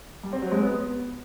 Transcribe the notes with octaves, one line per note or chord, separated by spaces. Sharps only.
G3
C4
F#3
G#3
B3